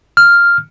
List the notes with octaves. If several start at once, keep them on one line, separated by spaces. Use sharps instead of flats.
F6